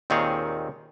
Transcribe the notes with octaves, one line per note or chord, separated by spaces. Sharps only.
D#2 A#2 D#3 C4 G#4 C#5